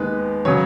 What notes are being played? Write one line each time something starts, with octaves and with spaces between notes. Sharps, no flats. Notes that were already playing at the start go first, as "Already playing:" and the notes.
Already playing: D#2 D#3 G#3 B3 B4
C#3 F#3 C#5